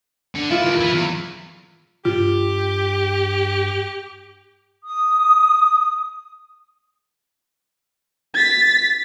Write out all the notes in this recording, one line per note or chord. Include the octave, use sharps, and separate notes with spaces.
D3
E4 F4
E3 A#3
E4 B4
E2
G2 F4 G4
D#6
A6 B6